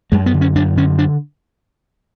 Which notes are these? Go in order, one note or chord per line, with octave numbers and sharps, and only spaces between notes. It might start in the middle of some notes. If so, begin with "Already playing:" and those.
F#2 G#3
B3
D3
C#4
F#2 D4
D3 C#4
D4